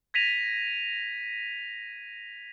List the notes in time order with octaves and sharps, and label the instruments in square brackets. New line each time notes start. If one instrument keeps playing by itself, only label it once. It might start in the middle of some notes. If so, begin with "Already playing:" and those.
[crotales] G#6 A#6 B6 D#7 F7